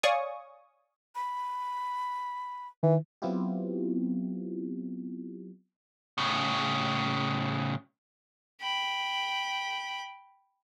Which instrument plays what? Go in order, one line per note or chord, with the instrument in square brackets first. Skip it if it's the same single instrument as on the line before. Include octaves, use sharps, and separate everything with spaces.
[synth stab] C#5 D5 F5 G#5 C#6 D#6
[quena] B5
[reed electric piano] D#3 [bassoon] E3
[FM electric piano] F#3 B3 C4 E4 F4 G4
[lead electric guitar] A2 C#3
[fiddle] G5 B5